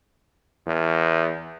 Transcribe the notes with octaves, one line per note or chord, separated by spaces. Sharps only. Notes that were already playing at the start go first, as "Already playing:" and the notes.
E2